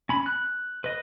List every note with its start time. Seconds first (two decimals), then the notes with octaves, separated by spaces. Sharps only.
0.09 C#4 B5
0.26 F#6
0.84 B4 D#5